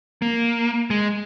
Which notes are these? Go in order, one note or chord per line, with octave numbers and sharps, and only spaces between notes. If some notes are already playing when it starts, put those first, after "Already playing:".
A#3
G#3